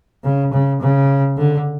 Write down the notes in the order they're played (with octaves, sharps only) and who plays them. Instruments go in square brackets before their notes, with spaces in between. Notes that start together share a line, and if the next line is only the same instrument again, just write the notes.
[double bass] C#3
C#3
C#3
D3